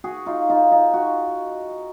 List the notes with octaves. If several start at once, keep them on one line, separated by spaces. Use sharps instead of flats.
F#4 G#4
D#4 F4
D#4 F4
D#4 F4
F#4